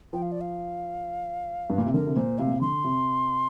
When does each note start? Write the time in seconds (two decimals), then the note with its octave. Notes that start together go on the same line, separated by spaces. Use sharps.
0.13 F3 G5
0.22 F5
0.32 D5
0.41 F5
1.70 G2
1.78 A#2
1.86 C3
1.93 D3 A#4
2.07 C3
2.16 A#2 C5
2.38 C3 F5
2.47 A#2
2.54 C3
2.61 D3 C6
2.84 C3